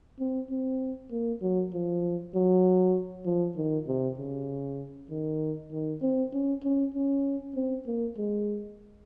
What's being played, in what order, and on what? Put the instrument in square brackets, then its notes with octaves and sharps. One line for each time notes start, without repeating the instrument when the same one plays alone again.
[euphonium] C4
C4
A#3
F#3
F3
F#3
F3
D#3
C3
C#3
D#3
D#3
C4
C#4
C#4
C#4
C4
A#3
G#3